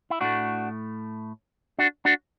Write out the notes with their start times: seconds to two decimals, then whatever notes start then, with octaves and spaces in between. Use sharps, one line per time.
0.10 E4
0.21 A2 A3 D4 F#4
1.79 D4 F#4
2.05 D4 F#4